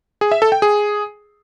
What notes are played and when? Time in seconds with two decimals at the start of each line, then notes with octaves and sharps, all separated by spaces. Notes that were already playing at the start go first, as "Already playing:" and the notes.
0.21 G#4
0.32 E5
0.42 A4
0.52 G5
0.62 G#4